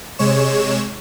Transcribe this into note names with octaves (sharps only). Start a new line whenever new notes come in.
C3 G#3 C#5 E7